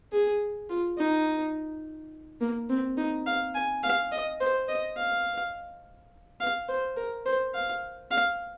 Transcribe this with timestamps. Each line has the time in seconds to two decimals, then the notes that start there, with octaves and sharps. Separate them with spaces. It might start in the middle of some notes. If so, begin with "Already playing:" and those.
0.12 G#4
0.69 F4
0.98 D#4
2.41 A#3
2.70 C4
2.98 D#4
3.26 F5
3.55 G#5
3.83 F5
4.12 D#5
4.40 C5
4.69 D#5
4.97 F5
6.40 F5
6.68 C5
6.97 A#4
7.26 C5
7.54 F5
8.11 F5